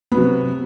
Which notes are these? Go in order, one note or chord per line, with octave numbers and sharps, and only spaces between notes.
C3 F#3 B3